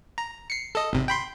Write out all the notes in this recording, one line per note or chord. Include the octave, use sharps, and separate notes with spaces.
A#5
C7 C#7
A4 D#5
G#1 C3
G5 B5 C6